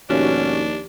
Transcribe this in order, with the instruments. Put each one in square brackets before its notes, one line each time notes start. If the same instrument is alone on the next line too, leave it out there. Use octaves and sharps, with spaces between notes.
[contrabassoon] D#2 [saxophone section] G#2 B2 C#4 [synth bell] F3 F#4 G4 [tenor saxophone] D4